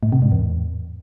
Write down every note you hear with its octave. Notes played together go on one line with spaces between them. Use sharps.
A2
C3
G#2
E2